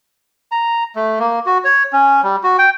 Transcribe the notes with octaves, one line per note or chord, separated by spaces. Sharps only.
A#5
A3
A#3
F#4
C#5
C#4
G3
F#4
G5